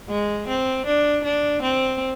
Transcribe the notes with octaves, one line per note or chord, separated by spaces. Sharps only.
G#3
C4
D4
D4
C4